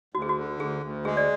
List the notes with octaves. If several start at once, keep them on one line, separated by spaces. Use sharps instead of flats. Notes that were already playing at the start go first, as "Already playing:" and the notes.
D2 F#4
G#4
F#4
D3
D2 G#4
D2
G#3 G#4
D5